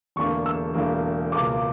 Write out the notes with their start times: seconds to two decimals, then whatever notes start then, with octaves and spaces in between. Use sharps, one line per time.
0.16 E1 E2 D3 A#3 C#6
0.46 E6
0.74 E1 E2 D3 A#3
1.32 C#2 B2 A#3 D6